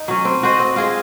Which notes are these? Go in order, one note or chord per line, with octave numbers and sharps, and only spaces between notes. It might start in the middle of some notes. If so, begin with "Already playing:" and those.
Already playing: D#4
F#3 C#4
C4
F#4 C5 D#5
C4
F4 G#4 D#5